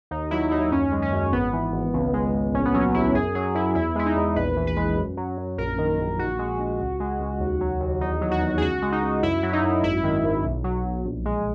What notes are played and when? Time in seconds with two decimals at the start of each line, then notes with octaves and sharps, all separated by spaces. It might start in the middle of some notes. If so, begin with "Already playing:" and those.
0.11 D#2 D#4
0.31 F#3 E4
0.51 D#2 D#4
0.71 F#2 C#4
0.92 G#3
1.02 C#4
1.12 F#2
1.32 G#1 B3
1.53 E3
1.73 G#1
1.93 C#2
2.13 G#3
2.34 C#2
2.54 A#1 C#4
2.65 B3
2.74 F#3 C#4
2.94 A#1 E4
3.15 F#2 G#4
3.35 F#3 G#4
3.55 F#2 E4
3.75 E2 E4
3.95 G#3 E4
4.06 D#4
4.16 E2
4.36 A#1 B4
4.56 E3
4.67 B4
4.76 G#3
4.97 F#2
5.17 F#3
5.37 F#2
5.58 A#1 A#4
5.78 D#3
5.99 A#1
6.18 A#1 F#4
6.39 G#3
6.59 A#1
6.80 C#2
7.00 G#3
7.19 C#2
7.40 D#2
7.61 F#3
7.80 D#2
8.01 E2 D#4
8.21 F#3
8.31 F#4
8.41 E2
8.58 G#4
8.61 C#2 F#4
8.82 G#3
8.92 D#4
9.02 C#2
9.23 F#2 E4
9.43 F#3
9.53 D#4
9.63 F#2
9.83 G#1 E4
10.04 D#3
10.24 G#1
10.44 B1
10.64 F#3
10.84 B1
11.05 A#1
11.25 G#3